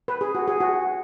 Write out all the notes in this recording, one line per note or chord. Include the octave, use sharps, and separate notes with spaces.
B4
G#4
F#4
G#4
F#4